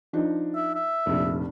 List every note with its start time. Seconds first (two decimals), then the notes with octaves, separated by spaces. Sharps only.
0.13 F3 D4 D#4
0.55 E5
0.75 E5
1.06 F1 A#1